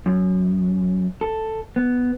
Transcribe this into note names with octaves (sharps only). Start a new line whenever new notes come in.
F#2
A4
B3